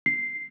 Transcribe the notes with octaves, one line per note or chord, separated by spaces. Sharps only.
C7